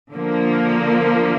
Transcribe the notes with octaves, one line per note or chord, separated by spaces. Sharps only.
D3 F3 A#3